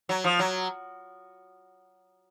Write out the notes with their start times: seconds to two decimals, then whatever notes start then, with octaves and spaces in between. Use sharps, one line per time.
0.09 F#3
0.24 F3
0.39 F#3